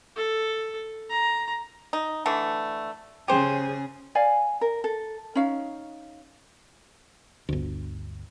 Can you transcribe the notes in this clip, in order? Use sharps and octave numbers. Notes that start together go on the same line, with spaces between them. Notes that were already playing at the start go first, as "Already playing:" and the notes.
A4
A#5
D#4
D3 E3 A3
C#3 G4 G#4 C5
D5 F5 G#5
A#4
A4
C#4 D#4 F5
G1 D2